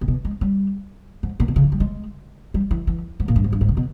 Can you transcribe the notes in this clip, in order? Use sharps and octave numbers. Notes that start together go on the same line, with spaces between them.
A#2
B2
G#3
G3
G#2
A#2
B2
C#3
E3
G3
G#3
G3
E3
E3
G#2
A#2
G2
G#2
G2
G#2
C#3
B2